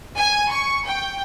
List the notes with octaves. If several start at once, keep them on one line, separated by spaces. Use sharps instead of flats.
G#5
C#6
G5